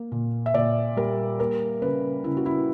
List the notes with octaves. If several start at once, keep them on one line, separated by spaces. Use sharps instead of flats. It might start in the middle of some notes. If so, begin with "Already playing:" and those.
Already playing: A#3
A#2
E5
A#2 D5
G3 A#4
A#3 A#4
C#3 B4
C#3 E4
F#4
E4